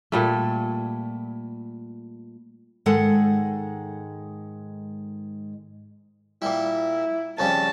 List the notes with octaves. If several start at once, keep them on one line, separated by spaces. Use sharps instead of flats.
A#2 G3 A3
G#2 D#3 G#3 A4 F#5
A#2 G3 E4
F2 C#3 G3 A5